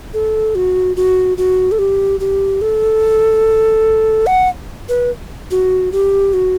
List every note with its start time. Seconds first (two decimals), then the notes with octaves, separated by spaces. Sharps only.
0.14 A4
0.55 F#4
0.96 F#4
1.38 F#4
1.72 A4
1.79 G4
2.20 G4
2.61 A4
4.27 F#5
4.89 B4
5.51 F#4
5.92 G4
6.33 F#4